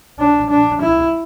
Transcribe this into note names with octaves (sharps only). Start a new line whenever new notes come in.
D4
D4
E4